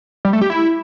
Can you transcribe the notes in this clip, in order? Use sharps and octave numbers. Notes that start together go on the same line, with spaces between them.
G3
A3
G4
E4